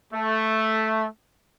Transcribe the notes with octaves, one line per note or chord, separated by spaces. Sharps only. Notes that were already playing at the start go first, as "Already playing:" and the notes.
A3